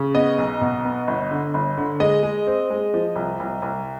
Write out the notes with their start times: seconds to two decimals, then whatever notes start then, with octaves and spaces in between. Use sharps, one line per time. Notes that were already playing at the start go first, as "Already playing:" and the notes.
Already playing: C#3
0.14 B3 D#5
0.38 B1
0.61 B2
0.85 B3
1.07 G1
1.31 D3
1.54 G1
1.78 D3
2.00 G#3 D#5
2.23 G#3
2.47 C4
2.70 G#3
2.94 F3
3.16 C2
3.40 C2
3.62 C2